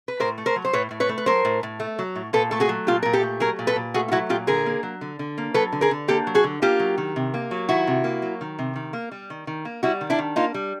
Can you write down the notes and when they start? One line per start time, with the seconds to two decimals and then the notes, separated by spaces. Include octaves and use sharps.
0.08 B4
0.20 A2 A#4 C5
0.38 A3
0.46 A#4 C5
0.56 F#3
0.65 C5
0.73 A2 B4 C#5
0.91 A2
1.00 B4 C#5
1.09 A3
1.18 B4
1.26 F#3 A#4 C5
1.45 A2
1.63 A2
1.80 A3
1.99 F#3
2.16 A2
2.33 A#2 A4 B4
2.51 A3 A4
2.60 F#4 G#4
2.69 F#3
2.87 A#2 F4 G4
3.03 A#2 A#4
3.13 G4 A4
3.23 A3
3.40 F#3 G#4 A#4
3.59 A#2
3.67 A4 B4
3.76 A#2
3.94 A3 F#4 G#4
4.08 F4
4.12 F#3 E4 F#4
4.29 A#2 F4 G4
4.47 D3 G#4 A#4
4.66 A#3
4.83 F#3
5.01 D3
5.19 D3
5.38 A#3
5.54 F#3 A4 B4
5.72 D3
5.81 G#4 A#4
5.91 D3
6.08 A#3 G4 A4
6.27 F#3
6.35 F#4 G#4
6.44 D3
6.62 A#3 F4 G4
6.80 F#3
6.98 D#3
7.16 C3
7.34 A#3
7.51 F#3
7.69 D#3 E4 F#4
7.87 C3
8.04 A#3
8.22 F#3
8.41 D#3
8.59 C3
8.76 D#3
8.93 A#3
9.11 G3
9.30 D#3
9.47 D#3
9.65 A#3
9.83 G3 E4 F#4
10.01 D#3
10.10 D4 E4
10.19 D#3
10.36 A#3 D#4 F4
10.54 G3